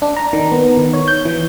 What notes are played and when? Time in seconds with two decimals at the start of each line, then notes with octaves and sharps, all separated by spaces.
0.02 D4
0.17 A#5
0.33 D#3
0.52 B3
0.77 D#3
0.93 C#5
1.08 G6
1.25 E3